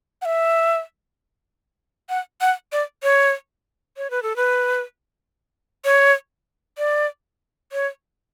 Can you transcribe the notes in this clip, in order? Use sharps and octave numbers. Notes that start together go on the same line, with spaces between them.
F#5
E5
F#5
F#5
D5
C#5
C#5
B4
A4
B4
C#5
D5
C#5